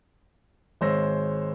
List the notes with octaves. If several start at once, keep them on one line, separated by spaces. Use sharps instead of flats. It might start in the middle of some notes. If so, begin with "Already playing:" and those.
G#1 G#3 C5 C#5 E6 A#6